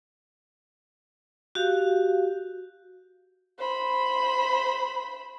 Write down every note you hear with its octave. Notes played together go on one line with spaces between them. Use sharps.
F#4 G4 F5
C5 B5